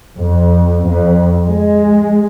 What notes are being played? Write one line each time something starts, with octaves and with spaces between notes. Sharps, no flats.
F2
F2
G#3